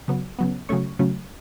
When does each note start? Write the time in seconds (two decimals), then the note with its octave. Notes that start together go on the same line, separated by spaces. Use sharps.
0.08 C#3 F#3 B3
0.39 C#3 F#3 B3
0.69 C#3 F#3 A3 C#4 C#6
0.99 C#3 F#3 A3 C#4